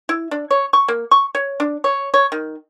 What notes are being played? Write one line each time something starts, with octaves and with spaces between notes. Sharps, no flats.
E4
D4
C#5
C#6
A#3
C#6
C#5
D4
C#5
C#5
D#3